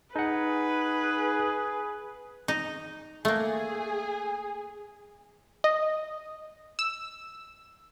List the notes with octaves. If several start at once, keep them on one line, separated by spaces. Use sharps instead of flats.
D#4 G#4 B4 F#5
D#4
A3 A#3 G#4
D#5
E6